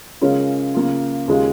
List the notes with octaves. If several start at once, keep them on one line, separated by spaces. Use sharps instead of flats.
C#3 G#3 C#4 F4 A#4
C#3 A#3 F4
D#2 C#3 G#3 F4